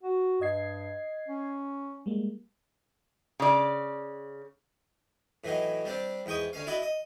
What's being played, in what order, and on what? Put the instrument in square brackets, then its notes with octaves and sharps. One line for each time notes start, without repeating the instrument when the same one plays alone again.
[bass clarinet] F#4
[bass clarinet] G2 [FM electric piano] D#5 G#6 C7
[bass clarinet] C#4
[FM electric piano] G3 G#3 A#3
[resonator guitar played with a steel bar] C#3 D5
[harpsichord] A2 E3 F#3 D#4
G3 C4 D4
E2 G#2 G5 C#6 D#6
D2 C#4 F5
E4 F#4 D5 D#5
D#5